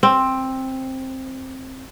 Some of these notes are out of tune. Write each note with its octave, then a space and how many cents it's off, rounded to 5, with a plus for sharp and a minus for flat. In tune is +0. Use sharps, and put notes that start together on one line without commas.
C4 +10